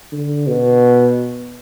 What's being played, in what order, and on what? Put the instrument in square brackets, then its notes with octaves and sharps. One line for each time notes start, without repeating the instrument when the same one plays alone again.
[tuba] D3
B2